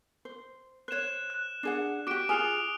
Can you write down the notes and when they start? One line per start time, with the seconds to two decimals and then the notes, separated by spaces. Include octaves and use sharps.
0.25 C5
0.88 C5 C#5 F#6 E7
1.30 F#6
1.63 D4 G#4 F#5
2.07 F#4 G4 D6 F#6 D7
2.29 F4 G#4 G#5 D#6 F6 F7